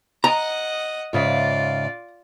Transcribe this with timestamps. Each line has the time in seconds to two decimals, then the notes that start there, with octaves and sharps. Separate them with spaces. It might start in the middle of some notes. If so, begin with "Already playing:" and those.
0.24 D#5 F#5 A#5
1.13 G#2 C#3 F4 D5 E5